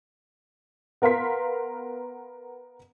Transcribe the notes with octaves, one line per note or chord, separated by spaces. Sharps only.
B3 A#4 F5 C6 B6